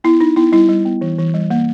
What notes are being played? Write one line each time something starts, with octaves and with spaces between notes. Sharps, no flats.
B3 E4
B3 D#4
B3 E4
G3 E4
G3
B3
E3
E3
G3
A#3